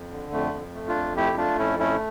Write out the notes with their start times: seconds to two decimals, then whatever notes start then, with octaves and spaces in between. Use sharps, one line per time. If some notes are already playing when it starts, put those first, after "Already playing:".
Already playing: F2
0.11 D3
0.32 F2 A3
0.53 F2
0.75 A3
0.88 D4 F4
0.95 F2
1.16 A3 E4 G4
1.37 A3 D4 F4
1.58 F2 C#4 E4
1.79 A3 C#4 E4